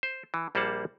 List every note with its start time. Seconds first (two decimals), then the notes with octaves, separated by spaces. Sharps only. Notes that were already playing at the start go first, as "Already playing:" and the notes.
0.03 C5
0.34 E3
0.55 A#1 G3 A#3 C5 F#5 A5